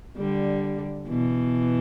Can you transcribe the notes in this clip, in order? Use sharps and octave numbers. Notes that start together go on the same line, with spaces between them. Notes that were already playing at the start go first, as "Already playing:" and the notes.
D3 G3
B2 E3